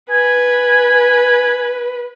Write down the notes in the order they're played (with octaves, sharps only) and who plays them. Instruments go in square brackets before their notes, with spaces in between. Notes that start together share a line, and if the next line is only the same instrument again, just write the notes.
[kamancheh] B4 [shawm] G#5